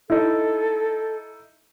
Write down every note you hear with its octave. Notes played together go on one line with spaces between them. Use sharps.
D#4 E4 A4